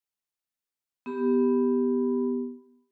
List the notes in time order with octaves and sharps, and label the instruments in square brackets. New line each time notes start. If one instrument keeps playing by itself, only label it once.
[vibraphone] B3 G4 B5